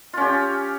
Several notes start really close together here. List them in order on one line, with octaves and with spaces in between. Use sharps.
F4 C#4 G4